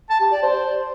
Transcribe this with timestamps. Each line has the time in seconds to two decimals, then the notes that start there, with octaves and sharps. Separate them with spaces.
0.10 A5
0.21 G4
0.32 D5
0.43 C5